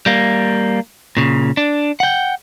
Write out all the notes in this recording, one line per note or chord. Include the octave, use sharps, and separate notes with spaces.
G3 A#3
A#2 C#3
D4
F#5 G5